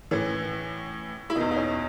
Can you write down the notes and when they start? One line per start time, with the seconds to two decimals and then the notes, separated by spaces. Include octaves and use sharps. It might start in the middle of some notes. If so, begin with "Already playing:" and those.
0.11 A2 E3 C#4
1.30 E4
1.35 E2 B2 D#4
1.51 D#4
1.56 C#4